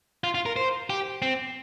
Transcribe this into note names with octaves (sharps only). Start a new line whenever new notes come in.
F4
F4
A#4
C5
G4
C4